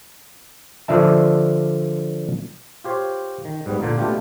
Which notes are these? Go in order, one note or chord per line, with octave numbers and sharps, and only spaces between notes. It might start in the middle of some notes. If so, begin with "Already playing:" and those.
D3 F3 D4 E5 A5
F4 G4 C5 C#5
D#3
G#2 G3 B3
A#2 D3 A#3 F4
B2 A3 B3 D4 F4 G4